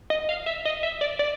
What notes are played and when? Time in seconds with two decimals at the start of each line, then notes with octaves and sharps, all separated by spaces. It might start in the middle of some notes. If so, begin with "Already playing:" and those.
0.10 D#5
0.29 F5
0.46 E5
0.65 D#5
0.83 E5
1.01 D5
1.19 D5